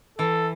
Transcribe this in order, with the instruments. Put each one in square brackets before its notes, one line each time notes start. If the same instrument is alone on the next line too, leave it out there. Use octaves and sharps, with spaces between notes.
[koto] E3 [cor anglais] A4